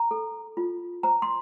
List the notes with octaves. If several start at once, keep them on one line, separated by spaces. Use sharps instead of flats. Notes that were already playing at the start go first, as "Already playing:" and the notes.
Already playing: A#5
A4
F4
C5 A#5
C6